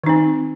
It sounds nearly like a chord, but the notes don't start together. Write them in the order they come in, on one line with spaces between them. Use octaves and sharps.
D#3 D#4 C4